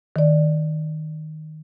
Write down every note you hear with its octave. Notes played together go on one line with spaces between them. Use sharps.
D#3 D5